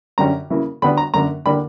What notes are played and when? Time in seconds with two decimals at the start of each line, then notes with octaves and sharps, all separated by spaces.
0.18 F#2 D3 G3 C#4 A#5
0.50 C#3 E3 A#3
0.82 D3 G3 B3 D4 B5
0.97 A#5
1.14 F#2 D3 A#3 A#5
1.46 D3 G3 A#3 D4 B5